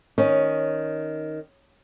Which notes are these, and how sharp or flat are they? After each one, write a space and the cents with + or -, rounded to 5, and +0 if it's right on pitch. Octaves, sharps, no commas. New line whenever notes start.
D#3 +0 C#4 +0